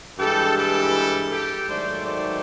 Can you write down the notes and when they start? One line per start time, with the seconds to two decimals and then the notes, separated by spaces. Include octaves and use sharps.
0.19 G2 E3 G#3 G4 A4
0.56 G4 A4
1.30 G4 A4
1.67 G#2 D#3 F#3 A3 C5 D5
2.04 C5 D5